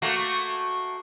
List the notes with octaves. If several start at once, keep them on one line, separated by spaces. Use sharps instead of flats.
A3 A#3 F#4